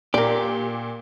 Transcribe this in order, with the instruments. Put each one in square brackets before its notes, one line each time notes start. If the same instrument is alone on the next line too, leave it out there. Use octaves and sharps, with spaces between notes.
[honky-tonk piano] A#2 [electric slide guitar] G4 [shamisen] A#4 D5